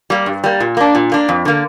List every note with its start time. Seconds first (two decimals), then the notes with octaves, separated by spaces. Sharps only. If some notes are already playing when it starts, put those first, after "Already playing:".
0.10 G3 A#3
0.26 G2
0.44 G3 A#3
0.60 A#2
0.77 A#3 D4
0.95 A#2
1.12 A#3 D4
1.29 F2
1.45 D3 A#3